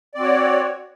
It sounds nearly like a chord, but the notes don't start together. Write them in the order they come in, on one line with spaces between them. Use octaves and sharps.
D5 C4 F#4 C#5